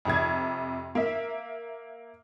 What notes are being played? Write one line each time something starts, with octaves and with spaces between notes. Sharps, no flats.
F2 C3 G#6
A#3 E5